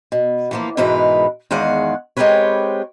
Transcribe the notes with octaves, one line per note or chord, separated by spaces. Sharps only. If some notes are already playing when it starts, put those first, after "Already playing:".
B2
E3 F3 A#3
G#2 B2 E3 G#3 A#4 B4
E2 D#3 G#3 F5 F#5
G#3 C4 G4 A#4 B4 C#5